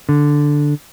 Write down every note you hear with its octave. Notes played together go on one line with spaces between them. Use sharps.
D3